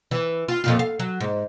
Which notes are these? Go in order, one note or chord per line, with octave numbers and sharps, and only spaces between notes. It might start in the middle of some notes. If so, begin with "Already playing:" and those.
E3
F4
F2 A#2 F4
F5
F#3
G#2